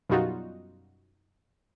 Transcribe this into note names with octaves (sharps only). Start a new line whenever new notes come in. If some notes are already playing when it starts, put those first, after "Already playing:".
F#2 B2 G3 D#4 F4 F#4